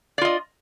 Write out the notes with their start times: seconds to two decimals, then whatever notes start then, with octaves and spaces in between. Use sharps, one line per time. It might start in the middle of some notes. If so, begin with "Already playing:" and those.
0.18 D5
0.21 F4
0.25 D#5